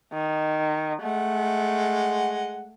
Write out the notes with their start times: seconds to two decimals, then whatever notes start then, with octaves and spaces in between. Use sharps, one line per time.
0.13 D#3
1.03 G#3 A3 F#5